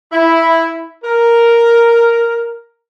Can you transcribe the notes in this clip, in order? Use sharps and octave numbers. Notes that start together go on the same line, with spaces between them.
E4
A#4